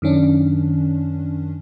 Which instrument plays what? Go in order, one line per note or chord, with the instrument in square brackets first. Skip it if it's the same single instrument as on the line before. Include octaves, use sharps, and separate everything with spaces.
[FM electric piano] F#2 D#3 C#4 D4